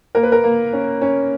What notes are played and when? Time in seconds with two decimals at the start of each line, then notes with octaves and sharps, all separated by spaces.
0.15 A#3 A#4
0.23 B4
0.32 A#4
0.44 A#3
0.73 C#4
1.01 C#4